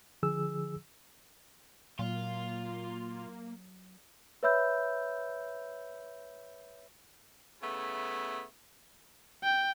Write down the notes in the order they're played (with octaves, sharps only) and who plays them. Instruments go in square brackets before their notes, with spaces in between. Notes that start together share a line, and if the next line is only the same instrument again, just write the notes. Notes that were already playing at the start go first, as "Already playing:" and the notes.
[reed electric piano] D3 F3 G#4 E6
[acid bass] A#2 [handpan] F#3 [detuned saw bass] A#3 [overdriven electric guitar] F4
[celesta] B4 C#5 E5 B5 E6 G6
[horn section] C#3 A3 B3 E4
[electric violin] G5